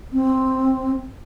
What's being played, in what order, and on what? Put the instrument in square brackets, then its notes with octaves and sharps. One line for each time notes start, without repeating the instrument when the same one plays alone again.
[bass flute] C4